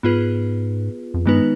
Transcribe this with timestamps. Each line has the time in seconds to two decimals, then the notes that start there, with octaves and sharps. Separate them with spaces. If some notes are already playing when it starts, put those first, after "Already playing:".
0.03 G#2 B3 F4 G#4 B4
1.14 F2
1.26 G2 D#3 G#3 B3 D#4 B4